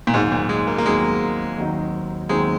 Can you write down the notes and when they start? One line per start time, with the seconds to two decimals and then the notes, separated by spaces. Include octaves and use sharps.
0.07 A#2
0.14 D#2 G#2 D#3 F#3 C4 D#4
0.32 A#2
0.49 G#3
0.67 A#3
0.78 A#3
0.85 D#2 D#3 F#3 G#3 C4 D#4
1.58 D#2 D#3 F#3 C4 D#4
2.29 D#2 D#3 F#3 G#3 C4 D#4